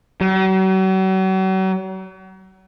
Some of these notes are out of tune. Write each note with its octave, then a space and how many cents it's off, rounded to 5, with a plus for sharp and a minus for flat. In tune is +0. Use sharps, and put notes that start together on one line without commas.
F#3 +40